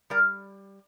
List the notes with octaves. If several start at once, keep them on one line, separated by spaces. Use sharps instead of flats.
G3 A#4 D5